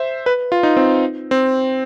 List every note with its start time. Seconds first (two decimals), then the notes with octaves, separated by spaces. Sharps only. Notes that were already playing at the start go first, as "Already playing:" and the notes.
Already playing: C5 E5
0.26 B4
0.52 F4
0.63 D#4
0.77 C4
1.31 C4